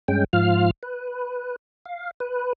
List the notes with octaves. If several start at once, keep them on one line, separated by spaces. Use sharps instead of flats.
G2 G#3 C#4 G5
G#2 F3 F4 F5 F6
B4
F5
B4